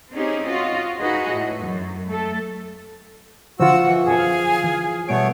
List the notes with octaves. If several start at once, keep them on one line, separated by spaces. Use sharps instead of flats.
C4 C#4 D#4 G4 G#4
F4 F#4 D#5
D#4 F#4 G#4 B4 D#5
A2
F#2
A3 A4
D3 F3 F4 F#4 C5 F#5 E6
E3
F#2 B2 G#4
F5
E3
B2 G3 A3 B3 C#5 D7